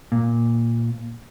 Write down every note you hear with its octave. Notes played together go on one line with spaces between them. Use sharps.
A#2